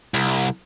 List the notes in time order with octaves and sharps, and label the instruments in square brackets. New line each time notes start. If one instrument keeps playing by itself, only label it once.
[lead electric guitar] C2